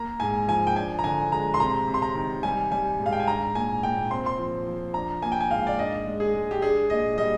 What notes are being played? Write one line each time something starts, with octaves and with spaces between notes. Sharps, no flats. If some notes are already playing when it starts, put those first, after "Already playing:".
Already playing: A#3 A#5
G#2 G#5
F3 G#5
G5
D4 G#5
A#5
D3 G#5
G#3 A#5
C6
C3 A#5
C3
C6
A#5
D#3
G3 G#5
G3 G#5
G#2
F5
G5
G#5
D4 A#5
A#2 G#5
A#2 G5
C4 C6
C6
F3
F3
D4 A#5
A#3 G#5
G5
G#5
G#2 F5
D5
D4 D#5
G#3
G#4
G#3
G4
D4 G#4
A#2 D#5
G3 D#5